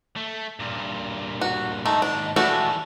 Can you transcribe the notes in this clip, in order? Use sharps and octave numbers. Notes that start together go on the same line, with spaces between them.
A3
G2 A#2
F#4
D#2 G#2 A3 D#4
D4
E3 G3 A3 D4 F#4